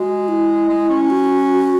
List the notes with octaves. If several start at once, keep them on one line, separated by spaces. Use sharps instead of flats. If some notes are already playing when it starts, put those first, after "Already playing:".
Already playing: G#3 F#4
E4
G#3
C#4
F#4